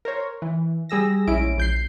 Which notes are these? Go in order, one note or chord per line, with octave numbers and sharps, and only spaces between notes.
A#4 C5 C#5
E3
G3 G#4 E6 A#6
A#1 G#3 C#4 E4 D7
A#1 G6 C7